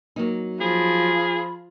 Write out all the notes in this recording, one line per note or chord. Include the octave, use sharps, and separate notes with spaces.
F#3 A#3 D#4
F3 G#4 B5